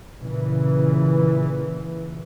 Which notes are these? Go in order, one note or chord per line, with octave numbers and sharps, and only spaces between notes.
A#2 C#3 E3